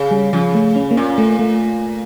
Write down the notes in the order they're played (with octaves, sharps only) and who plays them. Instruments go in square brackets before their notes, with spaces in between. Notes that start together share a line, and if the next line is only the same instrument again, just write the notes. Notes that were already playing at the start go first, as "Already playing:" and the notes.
Already playing: [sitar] C#3
[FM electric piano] G3
[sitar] C#3 [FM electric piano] F3
[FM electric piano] A3
C#4
A#3
[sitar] A#2 [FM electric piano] C#4
[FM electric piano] A3
A3